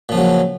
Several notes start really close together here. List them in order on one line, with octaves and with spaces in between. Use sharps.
A#2 F3 C#3 F#3